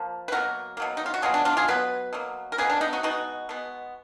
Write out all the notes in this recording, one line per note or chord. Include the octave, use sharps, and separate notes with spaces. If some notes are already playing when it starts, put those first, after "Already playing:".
Already playing: F3 A#3
B4
B2 F#3 A#3 F#4 A#4
B2 F#3 A#3
D#4
F4
F#4
B2 F#3 B3 F4 G#4
D4
D4 F4
F4 G#4
B2 F#3 B3 B4
B2 F#3 A#3
A#4
B2 F#3 A#3 G#4 B4
D4
B3 D#4
D#4 F#4
B2 G#3 B3 D#4 F#4
B2 G#3 B3